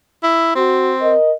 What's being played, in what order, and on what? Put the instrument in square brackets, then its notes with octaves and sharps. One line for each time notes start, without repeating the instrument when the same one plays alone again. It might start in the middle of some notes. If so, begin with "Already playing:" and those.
[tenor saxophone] E4
[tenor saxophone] C4 [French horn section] F#4
[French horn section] A#4 D#5